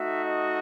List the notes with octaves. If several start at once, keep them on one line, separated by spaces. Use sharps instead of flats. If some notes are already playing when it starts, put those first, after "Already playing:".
Already playing: A3 D#4 F#4 E5
D#5